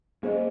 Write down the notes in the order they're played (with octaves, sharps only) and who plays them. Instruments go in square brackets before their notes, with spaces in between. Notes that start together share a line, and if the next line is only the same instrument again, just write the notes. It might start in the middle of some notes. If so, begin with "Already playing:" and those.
[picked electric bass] A#3 C#4 [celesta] G#4 C5 D#5